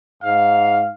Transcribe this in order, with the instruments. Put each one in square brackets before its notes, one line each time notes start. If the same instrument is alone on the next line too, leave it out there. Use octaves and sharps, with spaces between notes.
[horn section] G#2 F5